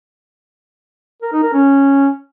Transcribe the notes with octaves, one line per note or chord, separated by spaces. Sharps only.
A#4
D#4
A#4
C#4